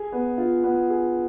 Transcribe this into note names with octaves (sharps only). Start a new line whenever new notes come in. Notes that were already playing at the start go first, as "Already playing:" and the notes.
Already playing: G#4
B3
F4
B3
G#4